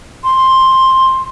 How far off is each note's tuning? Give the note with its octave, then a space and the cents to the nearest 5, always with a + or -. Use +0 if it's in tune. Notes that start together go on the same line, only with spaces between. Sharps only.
C6 +10